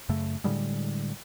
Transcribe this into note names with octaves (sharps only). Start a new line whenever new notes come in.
F#2 C#3 A3
A2 D3 G3 G#3